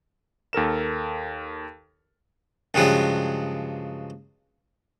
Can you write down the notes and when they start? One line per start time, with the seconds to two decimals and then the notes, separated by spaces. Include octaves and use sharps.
0.53 D#2 A4 A#4 E7
2.74 G2 C#3 F3 F#3 G#3